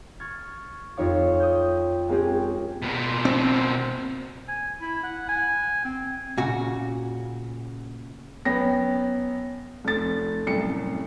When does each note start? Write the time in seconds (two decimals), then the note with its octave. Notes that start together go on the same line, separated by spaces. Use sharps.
0.20 C#6 F6 G#6 A6
0.97 F2 D#4 C#5 F5 D6
1.40 D#6 G6
2.08 G#3 A#3 C4 C#4 G4 G#4
2.82 B2 A#3
3.25 C4
4.48 G#5
4.81 E4
5.03 F#5
5.29 G#5
5.85 C4
6.37 A#2 C#3 F#4
8.45 F#2 B3 C#4 G5 A#6
9.85 F1 A6
10.47 C2 F#2 A2 C#7